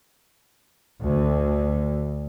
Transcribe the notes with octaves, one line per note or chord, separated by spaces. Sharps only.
D2